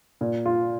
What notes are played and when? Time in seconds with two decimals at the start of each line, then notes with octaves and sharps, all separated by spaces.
0.21 A#2
0.46 F4